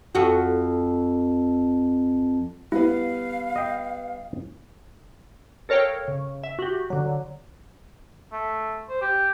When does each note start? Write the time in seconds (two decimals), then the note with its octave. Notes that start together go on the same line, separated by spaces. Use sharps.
0.15 F2 F#4
2.72 G3 B3 E4 B4 F5
3.56 D#5 G5
5.69 A4 A#4 C#5 F5 G5
6.08 C#3
6.43 E5
6.59 F#4 G4
6.90 D3 F#3
8.32 A3
8.89 C5
9.02 G4